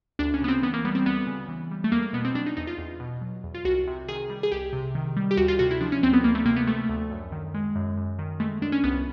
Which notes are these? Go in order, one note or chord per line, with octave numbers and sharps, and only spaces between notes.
D2 D4
C#4
C#3 B3
C4
E3 B3
A#3
G3 B3
C4
D2 B3
C#3
E3
G3
A3
E2 A#3
A#3
B2 B3
C4
F#3 D4
D#4
E2 D#4
F4
E2
B2
F#3
E2
F4
C2 F#4
C3
D#3 G#4
G3
G#4
C2 G4
C3
D#3
G3
G4
D2 F#4
F4
C3 F#4
E4
F3 D4
C#4
D2 C4
B3
D2 A#3
A3
C3 A#3
B3
F3 A3
D2
F#2
D#3
G#3
F#2
F#2
D#3
G#3 A3
F#2 D4
C#4
C2 B3